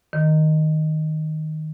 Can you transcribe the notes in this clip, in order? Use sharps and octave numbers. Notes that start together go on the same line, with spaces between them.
D#3